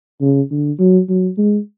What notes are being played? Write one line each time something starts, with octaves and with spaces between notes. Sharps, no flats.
C#3
D3
F#3
F#3
G#3